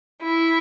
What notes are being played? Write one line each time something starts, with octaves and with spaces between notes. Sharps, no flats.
E4